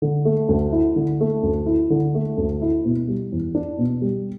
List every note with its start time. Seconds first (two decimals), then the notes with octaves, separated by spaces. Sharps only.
0.02 D3
0.25 A3
0.49 D2
0.72 E4
0.96 D3
1.20 A3
1.43 D2
1.66 E4
1.90 D3
2.15 A3
2.37 D2
2.62 E4
2.85 B2
3.08 G3
3.32 E2
3.55 D4
3.78 B2
4.02 G3